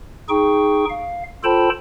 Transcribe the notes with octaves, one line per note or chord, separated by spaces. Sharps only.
D#4 G#4 G5 C#6
F5
F4 A4 C5 G5 A5 B5